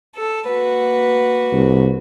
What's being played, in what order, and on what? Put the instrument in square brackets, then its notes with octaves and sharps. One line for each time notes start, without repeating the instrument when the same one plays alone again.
[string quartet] A4
A#3 F#4 B4
[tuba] C2